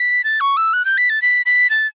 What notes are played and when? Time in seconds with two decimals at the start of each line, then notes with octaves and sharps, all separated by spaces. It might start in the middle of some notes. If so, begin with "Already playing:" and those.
Already playing: B6
0.24 A6
0.40 C#6
0.57 E6
0.73 F#6
0.85 G6
0.98 B6
1.10 A6
1.22 B6
1.46 B6
1.70 A6